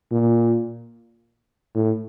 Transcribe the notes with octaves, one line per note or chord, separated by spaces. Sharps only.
A#2
A2